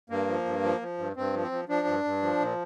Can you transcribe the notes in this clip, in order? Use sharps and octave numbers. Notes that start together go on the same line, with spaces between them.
G2 A#3
F3
G2
F3
F3
G2
G2 C4
F3
C4
F3
F3 D4
G2
G2
F3
A#2